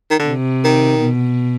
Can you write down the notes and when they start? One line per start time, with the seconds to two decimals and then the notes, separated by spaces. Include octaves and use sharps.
0.10 D#3
0.19 D3
0.28 C3
0.64 D#3
1.00 B2